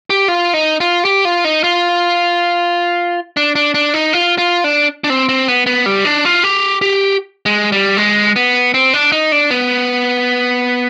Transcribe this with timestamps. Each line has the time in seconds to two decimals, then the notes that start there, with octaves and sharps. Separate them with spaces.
0.10 G4
0.28 F4
0.54 D#4
0.80 F4
1.05 G4
1.25 F4
1.45 D#4
1.64 F4
3.37 D4
3.55 D4
3.74 D4
3.94 D#4
4.13 F4
4.38 F4
4.64 D4
5.04 D4
5.10 C4
5.29 C4
5.48 B3
5.66 B3
5.86 G3
6.05 D4
6.25 F4
6.44 G4
6.81 G4
7.46 G#3
7.72 G3
7.97 G#3
8.36 B3
8.74 C4
8.93 D4
9.12 D#4
9.32 D4
9.51 B3